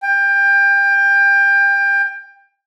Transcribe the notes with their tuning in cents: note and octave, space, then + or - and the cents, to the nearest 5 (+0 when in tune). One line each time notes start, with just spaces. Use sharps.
G5 +25